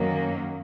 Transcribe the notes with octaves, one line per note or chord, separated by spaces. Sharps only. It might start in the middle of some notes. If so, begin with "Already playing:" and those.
Already playing: F#2 D#3 F#3 A#3 C#4